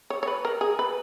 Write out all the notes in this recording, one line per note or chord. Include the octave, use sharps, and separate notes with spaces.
C#5
C#5
B4
A#4
G#4
B4